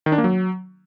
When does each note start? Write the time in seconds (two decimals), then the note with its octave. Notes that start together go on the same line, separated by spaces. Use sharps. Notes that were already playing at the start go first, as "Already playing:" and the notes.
0.06 D#3
0.12 D4
0.18 A#3
0.24 F#3